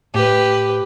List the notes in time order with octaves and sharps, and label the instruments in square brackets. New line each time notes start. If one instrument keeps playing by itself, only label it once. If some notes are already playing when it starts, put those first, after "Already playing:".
[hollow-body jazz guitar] A2 [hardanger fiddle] G4 B4